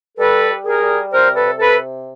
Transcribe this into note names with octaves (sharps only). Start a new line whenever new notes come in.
G3 A4 B4
G3
G#4 A#4
G3
C3 A#4 C5
A4 B4
C3
A4 B4